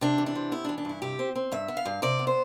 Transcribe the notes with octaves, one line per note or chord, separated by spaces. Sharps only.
C3 D4
E3
D4
C3
B3 E4
D4
E3
D4
G2 E4
C3 G4
C4
C4
G2 E5
B3
F5
G2
C3 D5
B3
C5